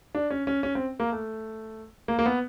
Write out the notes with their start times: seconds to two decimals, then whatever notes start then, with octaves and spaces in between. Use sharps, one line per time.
0.15 D4
0.30 C#4
0.47 C#4
0.63 C#4
0.75 C4
1.00 A#3
1.12 A3
2.08 A#3
2.19 A#3
2.26 B3